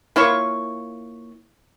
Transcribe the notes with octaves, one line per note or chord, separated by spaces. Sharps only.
A#3 E4 F4 C#5